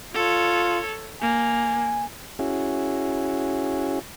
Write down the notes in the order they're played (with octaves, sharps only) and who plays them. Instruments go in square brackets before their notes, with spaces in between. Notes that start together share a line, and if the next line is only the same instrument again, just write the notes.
[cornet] F4 [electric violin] A4 C#5
[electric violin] A#3 [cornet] G#5
[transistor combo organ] C#4 E4 F#4 G#4